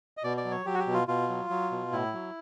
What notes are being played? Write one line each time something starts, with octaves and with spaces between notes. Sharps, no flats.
D#5
B2 D5
D5
F#3
C#5
F#3 G4
F#4
G4
B2
F4
B2 F4
F#3
F#3
B2
A2 E4
F#3